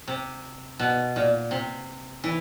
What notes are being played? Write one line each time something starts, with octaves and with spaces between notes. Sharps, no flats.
C3
B2
A#2
C3
E3